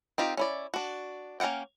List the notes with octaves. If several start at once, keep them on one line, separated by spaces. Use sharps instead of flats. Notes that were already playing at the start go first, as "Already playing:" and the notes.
C4 D#4 F4 G4
C#4 E4 D5
D4 F#4
A#3 C#4 F#4 F#5 G5